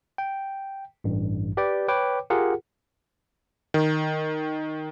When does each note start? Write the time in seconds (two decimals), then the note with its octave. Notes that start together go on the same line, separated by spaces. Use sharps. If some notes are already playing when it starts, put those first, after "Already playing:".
0.18 G5
1.04 A1 G2
1.57 G4 B4 D5 G5
1.88 B4 C#5 G5 D6
2.30 F4 G4 G#4 A#4 F#5
3.74 D#3